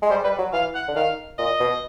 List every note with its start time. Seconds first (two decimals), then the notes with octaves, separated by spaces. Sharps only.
0.02 G#3
0.10 G3 C5
0.24 G3 B4
0.38 F#3
0.53 E3 F5
0.75 F#5
0.88 D3
0.96 D#3 F5
1.38 A#2 D#5
1.60 B2